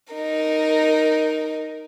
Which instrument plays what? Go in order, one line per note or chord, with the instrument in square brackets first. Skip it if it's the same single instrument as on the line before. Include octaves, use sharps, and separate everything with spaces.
[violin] D#4 A#4